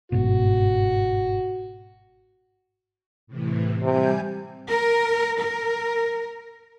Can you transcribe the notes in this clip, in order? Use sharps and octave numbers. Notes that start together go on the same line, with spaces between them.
G1 G#2 B2 F#4
A2 C3 E3
C3 G3 G#5 G6
A#4
A#4